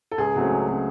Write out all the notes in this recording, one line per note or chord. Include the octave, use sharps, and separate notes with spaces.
A4
C#2 G#4
C#3 F#3 A3 C4
C#2
C#3 F#3 A3 C4